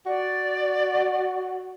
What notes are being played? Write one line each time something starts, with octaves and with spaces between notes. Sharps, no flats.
F#4 D5